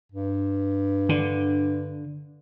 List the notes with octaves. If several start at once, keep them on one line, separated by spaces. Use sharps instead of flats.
G2
D3